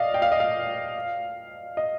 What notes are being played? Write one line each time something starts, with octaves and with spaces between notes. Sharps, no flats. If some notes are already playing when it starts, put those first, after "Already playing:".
Already playing: D5 D#5 F5
G5
F5
D#5
F5
D#5